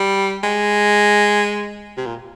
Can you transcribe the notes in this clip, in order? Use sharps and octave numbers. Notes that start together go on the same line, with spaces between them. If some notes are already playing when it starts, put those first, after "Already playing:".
Already playing: G3
G#3
C3
A#2